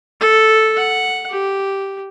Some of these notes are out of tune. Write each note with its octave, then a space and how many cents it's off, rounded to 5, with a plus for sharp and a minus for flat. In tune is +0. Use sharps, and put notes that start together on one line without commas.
A4 -5
F#5 -5
G4 -5